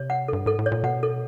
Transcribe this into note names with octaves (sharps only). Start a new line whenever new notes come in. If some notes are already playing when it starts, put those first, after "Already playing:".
Already playing: C3 C#5
F#5
G2 A4
G#2 A4
A2
C#5
A#2
B2 F#5
A4